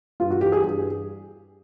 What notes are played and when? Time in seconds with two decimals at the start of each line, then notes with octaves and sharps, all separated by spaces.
0.20 G2 F4
0.31 F#4
0.41 E3 G4
0.52 G#4
0.64 G2